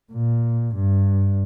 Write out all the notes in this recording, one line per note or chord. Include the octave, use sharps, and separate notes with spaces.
A#2
G2